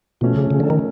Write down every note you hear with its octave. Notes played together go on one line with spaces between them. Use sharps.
B2 F3 A3 C#4
C#3
C#3
D3
D#3